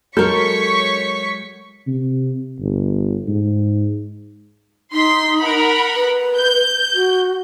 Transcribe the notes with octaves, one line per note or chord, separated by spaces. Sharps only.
F#3 G#3 A4 A#4 C#5 C#6 G6 B6
C3
G1
G#2
D#4 C6 B6
A#4 F#5 B5
B4
G6
F#4